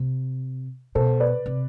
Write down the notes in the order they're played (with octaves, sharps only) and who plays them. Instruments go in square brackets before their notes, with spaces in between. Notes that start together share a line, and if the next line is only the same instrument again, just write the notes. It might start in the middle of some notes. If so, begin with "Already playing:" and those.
Already playing: [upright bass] C3
[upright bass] B2 [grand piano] A4 C5
[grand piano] B4 D5
[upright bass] C3